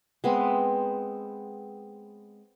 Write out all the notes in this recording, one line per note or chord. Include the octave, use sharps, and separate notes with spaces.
G#3 B3 C4